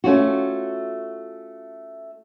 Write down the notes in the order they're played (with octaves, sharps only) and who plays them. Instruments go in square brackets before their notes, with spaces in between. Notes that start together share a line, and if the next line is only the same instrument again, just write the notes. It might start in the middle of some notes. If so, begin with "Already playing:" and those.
[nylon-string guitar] A3 C#4 F4 F#4